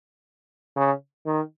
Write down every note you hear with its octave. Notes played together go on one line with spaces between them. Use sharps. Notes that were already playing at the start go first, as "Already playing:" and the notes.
C#3
D#3